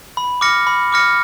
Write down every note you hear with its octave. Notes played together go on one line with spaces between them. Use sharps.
B5
D6 F6 A#6 C#7
B5
D6 F6 A#6 C#7